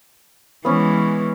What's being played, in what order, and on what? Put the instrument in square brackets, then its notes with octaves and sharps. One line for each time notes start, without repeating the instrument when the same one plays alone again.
[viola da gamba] E3 G#3 [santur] B3 C#4